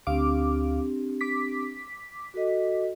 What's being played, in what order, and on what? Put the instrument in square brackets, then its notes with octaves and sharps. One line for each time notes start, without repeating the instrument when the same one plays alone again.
[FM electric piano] D2 F5 D6 [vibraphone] C4 D4 G4
[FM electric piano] D6 B6
[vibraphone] F#4 A4 D#5